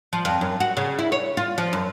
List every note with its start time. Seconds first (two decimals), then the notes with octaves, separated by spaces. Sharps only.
0.13 F3
0.25 F2
0.41 F#2
0.60 F#4
0.77 C#3
0.99 E4
1.12 C#5
1.37 F4
1.58 F3
1.73 F#2